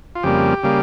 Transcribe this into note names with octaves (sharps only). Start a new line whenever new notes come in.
F4
F2 C#3 G3 A#3 G4
C#3 G3 A#3